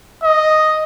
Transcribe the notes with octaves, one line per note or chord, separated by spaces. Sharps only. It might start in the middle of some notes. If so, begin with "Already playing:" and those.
D#5